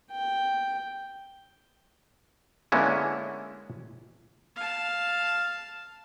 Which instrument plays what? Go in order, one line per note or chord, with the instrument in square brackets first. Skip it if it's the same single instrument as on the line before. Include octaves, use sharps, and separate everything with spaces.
[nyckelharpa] G5
[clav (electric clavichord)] D3 G#3 A#3 B3 C#4 E4
[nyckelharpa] F5 A5